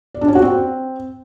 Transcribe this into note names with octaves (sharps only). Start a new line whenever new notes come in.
D5
D4
C#4
F#4
C4